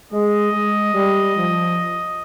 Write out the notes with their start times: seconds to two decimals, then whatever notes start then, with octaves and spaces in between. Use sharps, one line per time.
0.12 G#3 D#5
0.52 G#3
0.94 G3
1.36 F3